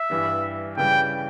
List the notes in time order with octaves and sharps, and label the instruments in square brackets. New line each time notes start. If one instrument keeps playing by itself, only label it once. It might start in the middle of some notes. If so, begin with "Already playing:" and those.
Already playing: [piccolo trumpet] E5
[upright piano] G2 E3 G3
[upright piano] C#3 E3 G3 [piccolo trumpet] G5